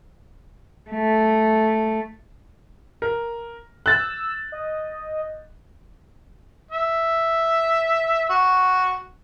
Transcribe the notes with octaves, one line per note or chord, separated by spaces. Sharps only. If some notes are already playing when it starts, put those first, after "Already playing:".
A3
A#4
E6 F#6 A6
D#5
E5
F#4